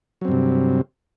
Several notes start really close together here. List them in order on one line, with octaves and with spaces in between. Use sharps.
F#3 C4 G2 C3